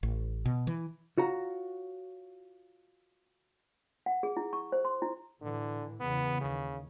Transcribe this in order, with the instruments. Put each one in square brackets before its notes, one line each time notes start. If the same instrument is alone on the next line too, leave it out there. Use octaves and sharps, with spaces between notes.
[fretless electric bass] A1
B2
E3
[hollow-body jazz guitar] F4 F#4 C#5 A#5
[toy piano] F#5
G#4
E4
C#6
C5
C6
E4
[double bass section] A2 E3 [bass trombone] D3
[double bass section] E2 C#3 E3 [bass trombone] B3
[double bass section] D#2 [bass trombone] C#3